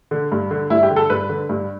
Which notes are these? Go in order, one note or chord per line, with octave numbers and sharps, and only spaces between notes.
D3
G2
D3
G2 E4
G4
D3
A4
G2 B4
D3
G2